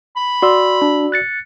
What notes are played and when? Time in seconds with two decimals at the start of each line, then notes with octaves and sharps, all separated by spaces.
0.16 B5
0.42 F#4 D5 C6 E6
0.82 D4
1.12 F#6 A6 C#7